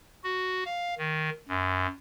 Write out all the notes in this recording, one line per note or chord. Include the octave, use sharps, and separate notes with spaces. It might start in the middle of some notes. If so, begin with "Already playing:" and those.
F#4
F5
D#3
F#2